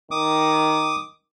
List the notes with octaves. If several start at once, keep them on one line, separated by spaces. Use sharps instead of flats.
D#3 D6 D#6